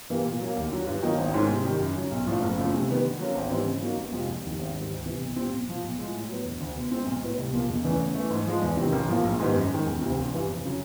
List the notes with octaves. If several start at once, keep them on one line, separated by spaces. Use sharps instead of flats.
G2 E3 G3 A#3
A#2
F#3 A#3
D#2
D3 F#3
G2
D#3 F#3 A#3 D#4
G#1
G#2 D#3 G#3 C#4
C3
D#3 G3
F#2
C#3 F#3
B1
A2 F3 A3 D4
F#1
F#2 C#3 F3 A3
C3
D#3 G3 B3
D3
F#3 A#3 C#4
G#1
G#2 E3 G3 C4
C#3
F#3 A#3 D#4 F#4
G1
F2 C3 F3 G#3
F1
D#2 D#3 G3
G#1
G#2 D#3 G3
D2
C3 E3
B1
A#2 G3 C4
B1
A#2 F3
B1
A2 F3 G#3
A2
F#3 B3
E1
D2 D3
B2
G#3 C4
B1
A2 F#3 B3
C2
A#2 F3 A#3
E1
E2 C#3 E3 A3
C#3
E3 A3
G#2
F3 G#3
E2
C3 D#3
A1
A2 F3 A#3
A#1
G#2 D#3 G3 B3
F#2
D#3 G#3
E1
D2 C3
A1
G2 E3 G3
F1
C#3 F#3